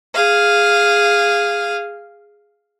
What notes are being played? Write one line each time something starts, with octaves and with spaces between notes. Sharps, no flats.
G#4 F5